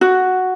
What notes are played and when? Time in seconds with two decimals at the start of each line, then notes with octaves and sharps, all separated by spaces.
0.01 F#4